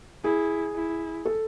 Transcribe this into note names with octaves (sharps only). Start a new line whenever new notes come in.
E4 G#4
E4
A4